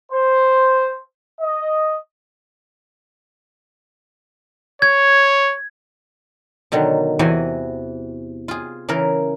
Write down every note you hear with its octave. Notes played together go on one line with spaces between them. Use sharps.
C5
D#5
C#5 G#6
B2 D3 D#3 F#3
E2 C3 E3 F#4 G#5
F4 G#4
C#3 E3 A#4 E5